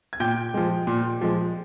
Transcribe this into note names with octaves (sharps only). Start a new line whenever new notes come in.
G#6
A#2 G5 G6
F3 G#3
A#2
F3 G#3